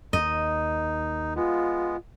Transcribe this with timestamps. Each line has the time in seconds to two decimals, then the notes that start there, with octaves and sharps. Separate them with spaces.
0.13 D#2 D#4 D#5
1.36 G#3 B3 F4